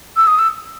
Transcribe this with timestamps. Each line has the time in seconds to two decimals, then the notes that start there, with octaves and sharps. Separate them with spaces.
0.17 E6
0.27 D#6
0.39 E6